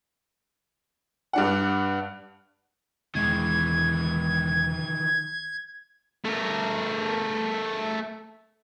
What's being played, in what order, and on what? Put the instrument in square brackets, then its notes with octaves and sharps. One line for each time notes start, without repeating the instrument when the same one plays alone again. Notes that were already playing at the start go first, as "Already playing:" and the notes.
[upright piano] G2 D4 F#5
[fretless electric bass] E1 G#3 [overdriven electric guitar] D#3 E3 [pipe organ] G#6
[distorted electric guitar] A3 A#4